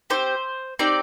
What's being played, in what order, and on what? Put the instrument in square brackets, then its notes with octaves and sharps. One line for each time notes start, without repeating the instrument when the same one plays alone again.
[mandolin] C4 D#4 G4 C5
C4 D#4 G4 D5